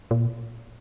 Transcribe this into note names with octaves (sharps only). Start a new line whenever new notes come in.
A#2